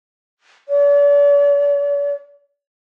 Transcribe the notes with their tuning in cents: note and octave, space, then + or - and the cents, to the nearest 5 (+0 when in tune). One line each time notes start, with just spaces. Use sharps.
D5 -45